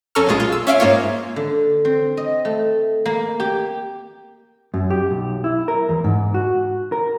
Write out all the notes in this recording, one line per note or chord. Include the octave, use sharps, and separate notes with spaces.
F2 C#4 A4 A#5 C#6 F6
B1 A#2 G#3 F4 G#4
F4
E6
C#4 E5 F5 D7
G#2 A#3 F4 C#5
D3
C4
D#5
A3
A#3
G4
F#2
G4
B1
E4
A#4
E2
G#2
F#4
A#4